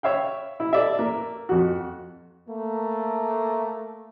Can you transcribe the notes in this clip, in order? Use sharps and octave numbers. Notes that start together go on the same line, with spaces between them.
C#5 E5 F5 G5
E4
A4 D5 E5
A#3
F2 F#4
A3 A#3